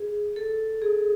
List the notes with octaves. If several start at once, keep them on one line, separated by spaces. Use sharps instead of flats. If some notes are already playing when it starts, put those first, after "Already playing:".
Already playing: G#4
A4
G#4